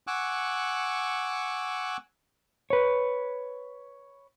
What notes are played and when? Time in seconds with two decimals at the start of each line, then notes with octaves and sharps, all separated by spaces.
0.07 F#5 G#5 C#6 D6 E6 F#6
2.70 B4 C#5